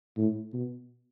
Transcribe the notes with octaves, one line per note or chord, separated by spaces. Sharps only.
A2
B2